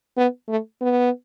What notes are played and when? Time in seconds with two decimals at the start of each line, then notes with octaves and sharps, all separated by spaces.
0.17 B3
0.48 A3
0.81 B3